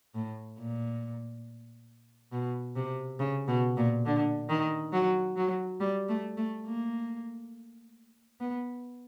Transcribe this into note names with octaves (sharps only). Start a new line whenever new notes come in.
A2
A#2
B2
C3
C#3
B2
A#2
D3
D#3
F#3
F#3
G3
A3
A3
A#3
B3